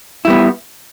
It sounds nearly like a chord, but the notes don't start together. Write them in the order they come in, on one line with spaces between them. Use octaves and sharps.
E4 G3 B3